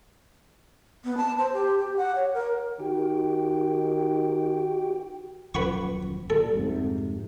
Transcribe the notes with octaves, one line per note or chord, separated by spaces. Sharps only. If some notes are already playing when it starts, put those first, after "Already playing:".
B3
A5
C5
G4
G4
F#5
C#5
A#4
D#3 F#4 G4 G5
D#1 F#2 F3 B4 F#5 C#6
A#2 G3 A4
F2 G#2 C3